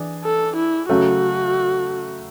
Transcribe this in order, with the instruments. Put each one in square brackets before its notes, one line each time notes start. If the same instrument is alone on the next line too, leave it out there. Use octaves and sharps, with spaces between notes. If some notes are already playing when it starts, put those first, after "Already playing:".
Already playing: [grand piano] E3 D4 G#4
[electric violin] A4
E4
[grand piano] C#3 F#3 A3 [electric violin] F#4